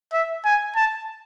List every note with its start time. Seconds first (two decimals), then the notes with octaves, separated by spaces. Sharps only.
0.13 E5
0.45 G#5
0.76 A5